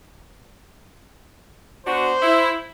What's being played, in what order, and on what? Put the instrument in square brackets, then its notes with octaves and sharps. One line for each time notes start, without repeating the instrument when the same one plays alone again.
[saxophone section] B3 D4 F#4 [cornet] C5
[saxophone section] E4